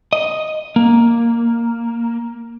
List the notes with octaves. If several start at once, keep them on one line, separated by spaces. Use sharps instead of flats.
D#5
A#3